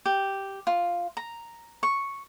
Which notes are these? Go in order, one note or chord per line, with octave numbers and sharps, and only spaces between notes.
G4
F4
A#5
C#6